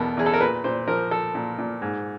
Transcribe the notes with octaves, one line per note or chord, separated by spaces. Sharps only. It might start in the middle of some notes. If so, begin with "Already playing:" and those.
Already playing: E2 B2 A4 A#4
E2 G#4
A4
A#4
A#2 B4
A#2 C5
F3 A#4
F3 A4
A#2
A#2
G#2